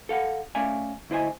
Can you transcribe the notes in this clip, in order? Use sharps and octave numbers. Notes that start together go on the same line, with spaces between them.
A4 F5 F#5
A3 C#4 D5 E5 F5 G#5
D2 E4 C5 D#5 G#5